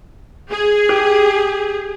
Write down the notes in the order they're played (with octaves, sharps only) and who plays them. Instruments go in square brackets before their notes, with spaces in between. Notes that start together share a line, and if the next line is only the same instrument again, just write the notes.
[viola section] G#4
[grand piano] G4